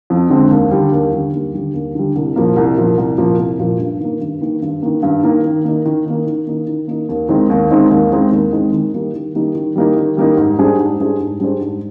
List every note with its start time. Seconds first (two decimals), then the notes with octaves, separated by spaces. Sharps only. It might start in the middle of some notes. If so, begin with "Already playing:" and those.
0.10 F2
0.30 D3 G#3 C4
0.51 D#2
0.71 D3 G3
0.92 D#2
1.13 D3 G3
1.33 D#2
1.54 D3 G3
1.74 D#2
1.95 D3 G3
2.15 C2
2.36 A#2 F3 A#3
2.56 C2
2.77 A#2 F3 A#3
2.97 C2
3.18 A#2 F3 A#3
3.38 C2
3.59 A#2 F3 A#3
3.79 G2
4.00 D#3 A#3
4.21 G2
4.41 D#3 A#3
4.62 G2
4.82 D#3 A#3
5.03 G2
5.23 D#3 A#3
5.44 D#3
5.65 A#3 D#4
5.85 D#3
6.06 A#3 D#4
6.26 D#3
6.47 A#3 D#4
6.67 D#3
6.88 A#3 D#4
7.09 D#2
7.29 D#3 G#3 C4 D#4
7.50 D#2
7.70 D#3 G#3 C4 D#4
7.91 D#2
8.11 D#3 G#3 C4 D#4
8.32 D#2
8.52 D#3 G#3 C4 D#4
8.72 D#3
8.93 G3 A#3 D#4
9.14 D#3
9.35 G3 A#3 D#4
9.55 D#3
9.76 G3 A#3 D#4
9.96 D#3
10.17 G3 A#3 D#4
10.37 G#2
10.58 G3 D4 G#4 C5
10.78 G#2
10.99 G3 D4 G#4 C5
11.20 G#2
11.40 G3 D4 G#4 C5
11.61 G#2